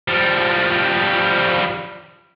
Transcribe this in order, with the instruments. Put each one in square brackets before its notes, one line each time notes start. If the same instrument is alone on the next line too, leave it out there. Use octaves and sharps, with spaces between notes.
[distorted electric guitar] F3 G3